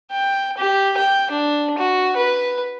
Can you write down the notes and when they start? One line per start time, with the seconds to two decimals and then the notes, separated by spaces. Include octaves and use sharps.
0.11 G5
0.58 G4
0.97 G5
1.31 D4
1.78 F#4
2.16 B4